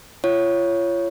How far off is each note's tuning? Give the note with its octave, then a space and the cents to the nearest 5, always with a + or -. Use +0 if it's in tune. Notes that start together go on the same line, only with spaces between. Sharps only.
F4 -30 C#5 +0